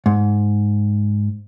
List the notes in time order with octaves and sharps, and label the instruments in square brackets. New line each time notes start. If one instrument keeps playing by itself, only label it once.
[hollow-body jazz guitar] G#2